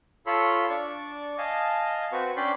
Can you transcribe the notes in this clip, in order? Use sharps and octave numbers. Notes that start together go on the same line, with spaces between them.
F4 A4 C#5 B5 C6
D4 D5 C#6
D#5 F5 G#5 A5
C4 F#4 B4 C#6
C#4 D4 D5 G5 B5 C6